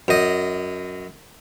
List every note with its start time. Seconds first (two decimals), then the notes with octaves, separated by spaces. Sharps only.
0.08 F#2 D#5